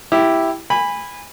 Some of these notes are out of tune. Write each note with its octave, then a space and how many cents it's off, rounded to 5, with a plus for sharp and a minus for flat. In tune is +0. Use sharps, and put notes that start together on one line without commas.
E4 +0 G4 +0
G#5 -25 B5 +0